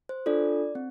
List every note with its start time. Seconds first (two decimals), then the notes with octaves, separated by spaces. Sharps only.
0.09 C5
0.26 D4 F4 A4 D5
0.75 C4